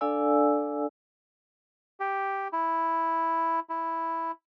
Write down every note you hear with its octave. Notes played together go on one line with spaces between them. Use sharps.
D4 A4 D5 F5 G#5 E6
G4
E4
E4